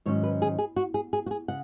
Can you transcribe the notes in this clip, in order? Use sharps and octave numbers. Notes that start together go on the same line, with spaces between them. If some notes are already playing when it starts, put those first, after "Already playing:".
G#2 D#3 F#3 C#4 C#5
B4
G#4
G#4
F#4
G#4
G#4
F#4
G#4
C#3 F#5